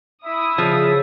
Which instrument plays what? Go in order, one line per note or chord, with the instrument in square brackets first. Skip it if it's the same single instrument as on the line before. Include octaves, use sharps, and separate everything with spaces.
[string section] E4 D#6 [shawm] E5
[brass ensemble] C#3 [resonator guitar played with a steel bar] F3